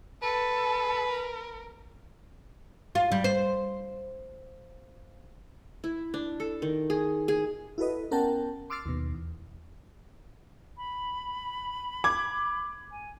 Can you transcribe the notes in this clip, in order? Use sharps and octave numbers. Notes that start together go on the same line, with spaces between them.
A4 B4
A#4
F4
G3
C5
E4
D4
A4
D#3
G#4
G#4
E4 F#4 A4 B4 D#5
B3 C#4 A#4 F#5 G5 A5
C6 D6 E6 F6 A6 C7
D#2 B2
E2
B5
D6 G#6
G#5